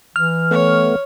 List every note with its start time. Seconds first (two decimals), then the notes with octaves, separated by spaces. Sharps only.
0.16 E3 F6
0.51 A3 B3 C#5